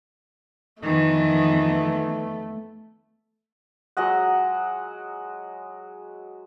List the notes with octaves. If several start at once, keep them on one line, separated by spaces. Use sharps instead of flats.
F2 D#3 E3 A3 B3
F#3 G#3 D#5 F#5